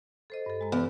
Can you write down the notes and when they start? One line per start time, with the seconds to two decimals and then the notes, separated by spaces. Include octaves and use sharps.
0.30 A4 C5 D#5
0.46 G2 A4
0.61 G#3 A#5
0.72 E2